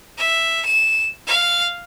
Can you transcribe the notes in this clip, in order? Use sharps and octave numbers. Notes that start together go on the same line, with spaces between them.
E5
E7
F5